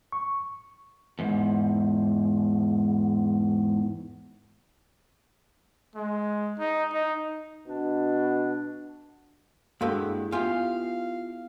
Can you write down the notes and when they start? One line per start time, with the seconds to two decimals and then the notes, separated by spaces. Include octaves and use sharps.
0.12 C#6
1.19 E2 G#2
5.95 G#3
6.59 D#4
6.92 D#4
7.67 B2 D4
9.81 G2 G#3 A#3 E4 F#4 A4 F5
10.32 B3 E4 F4 G4 F5 G#5